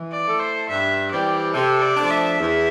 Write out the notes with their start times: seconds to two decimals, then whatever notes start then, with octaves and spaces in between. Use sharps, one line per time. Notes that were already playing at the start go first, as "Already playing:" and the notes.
Already playing: E3
0.11 D5
0.26 A3 E4 A4
0.40 C5
0.69 G2 E5
1.11 E3 G3 C4 G4 D5
1.54 C3 A4
1.82 D5
1.97 F3 A3 D4
2.11 E5
2.39 E2